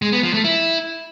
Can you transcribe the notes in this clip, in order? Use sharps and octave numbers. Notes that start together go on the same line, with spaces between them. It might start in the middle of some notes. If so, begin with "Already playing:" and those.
G#3
B3
F3
A3
E4